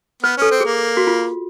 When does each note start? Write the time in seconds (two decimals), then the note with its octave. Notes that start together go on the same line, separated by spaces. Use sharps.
0.23 B3 B4
0.37 C#4 A4
0.51 C4
0.61 A#3 G#4
0.97 F#4
1.07 F4